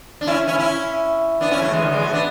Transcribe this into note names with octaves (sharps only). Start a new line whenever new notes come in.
D4
C#4 E4
C#4 E4
C#4 E4
B3 D4
C#4 E4
F#3 A3
E3 G#3
D3 F#3
E3 G#3
F#3 A3
B3 D4